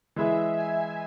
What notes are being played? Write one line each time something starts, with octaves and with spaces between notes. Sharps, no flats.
E3 G#3 E4 G#4 B4 E5
G#5